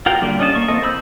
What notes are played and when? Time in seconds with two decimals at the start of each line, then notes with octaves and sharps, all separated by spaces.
0.06 F4 F#4 A#4 F5 G5
0.21 D3 G3 A#3 D5
0.39 C#4 D4 D#5 F#5 A5
0.55 A#3 C#6
0.68 E3 A#3 C4 A4 D#5
0.83 C5 B5 E6 G6